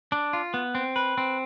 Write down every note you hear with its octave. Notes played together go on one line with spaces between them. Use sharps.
D4
F4
B3
C4
B4
C4